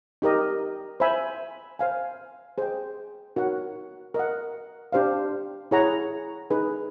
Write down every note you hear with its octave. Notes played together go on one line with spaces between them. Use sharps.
D#4 G4 A#4 D#5
C5 E5 G#5 B5
C5 F5 G#5
G#4 C5 D#5 G5
D#4 F#4 A#4 C#5 F#5
A#4 D#5 F#5
D4 G4 C5 F5
E4 G#4 C#5 F#5 A#5
D#4 G#4 B4